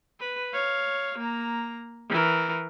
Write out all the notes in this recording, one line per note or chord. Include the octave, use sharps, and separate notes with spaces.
B4
C#5 F5
A#3 A#5
E3 A#4